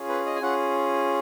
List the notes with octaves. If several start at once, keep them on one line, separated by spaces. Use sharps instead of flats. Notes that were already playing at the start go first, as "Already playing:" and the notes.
Already playing: C#4 F4 G#4
B4
D#5
G#5
C#4 F4 G#4 F#5